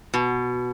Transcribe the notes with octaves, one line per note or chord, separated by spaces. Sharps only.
B2